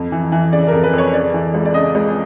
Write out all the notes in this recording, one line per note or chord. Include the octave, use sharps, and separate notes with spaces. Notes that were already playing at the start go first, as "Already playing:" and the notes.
Already playing: F2
E3
E3
C#3 D5
F2 A#4
B4
F2 C#5
C#3 D5
E3
C#2
D5
C#3 D#5
C#2